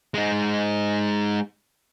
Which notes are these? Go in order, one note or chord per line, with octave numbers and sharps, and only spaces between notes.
G#3 D#4